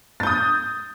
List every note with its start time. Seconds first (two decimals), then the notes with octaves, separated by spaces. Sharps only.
0.20 A6
0.23 G6
0.27 D#6